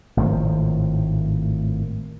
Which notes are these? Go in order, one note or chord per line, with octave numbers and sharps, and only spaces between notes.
G#1 A2 D#3 F3